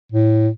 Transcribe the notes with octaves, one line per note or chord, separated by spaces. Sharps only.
A2